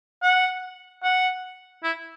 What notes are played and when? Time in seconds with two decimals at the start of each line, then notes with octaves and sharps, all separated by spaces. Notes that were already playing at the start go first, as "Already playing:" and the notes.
0.22 F#5
1.03 F#5
1.83 E4